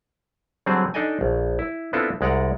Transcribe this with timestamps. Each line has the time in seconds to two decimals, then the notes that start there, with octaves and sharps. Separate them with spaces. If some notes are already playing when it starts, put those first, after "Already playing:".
0.66 D3 F#3 G3 C4 G#4 C5
0.94 D4 D#4 A4 D5 D#5 G#5
1.21 A#1
1.59 E4
1.93 B3 C4 D4 E4 F4 A4
2.21 C2 G#3 D5 F#5 A#5